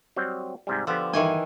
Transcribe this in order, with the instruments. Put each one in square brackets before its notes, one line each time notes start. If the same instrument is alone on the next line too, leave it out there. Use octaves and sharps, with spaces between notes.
[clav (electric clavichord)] F#3 G3 C4
G#2 C3 G3
[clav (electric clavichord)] D3 B3 G4 [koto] F3
[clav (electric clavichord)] G1 [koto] D#3 E3 G#5